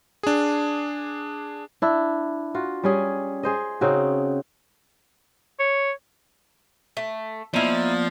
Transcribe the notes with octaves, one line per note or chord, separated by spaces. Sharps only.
D4 G#4
D4 E4
F4 F#4
G3 C#4 G#4
G#4 C5 D#5
C#3 C4 D#4 F#4
C#5
A3
F3 A#3 B3 D#4 E4 D5